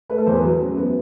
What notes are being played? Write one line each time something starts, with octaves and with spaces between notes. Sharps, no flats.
A3 B4
A4
E2 C5
B4
F#3
F#2
B3